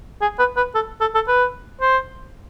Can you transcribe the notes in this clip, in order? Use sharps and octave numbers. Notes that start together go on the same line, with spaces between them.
G#4
B4
B4
A4
A4
A4
B4
C5